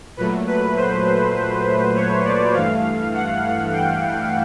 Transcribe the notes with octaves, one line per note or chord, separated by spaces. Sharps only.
A#2 F#3 A3 B4
B4
C5
C#5
D5
G2 E3 A3 F5
F#5
G5